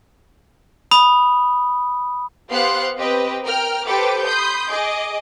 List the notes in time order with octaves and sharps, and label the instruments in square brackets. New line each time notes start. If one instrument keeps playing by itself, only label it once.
[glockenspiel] B5 D#6
[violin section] B3 G4 C5 F5 C6 F#6
C4 G4 B4 D#5
A#4 G5 F6
G4 A4 B4 C5 G5 D6
B5 C6 D#6 G6
G#4 D#5 D6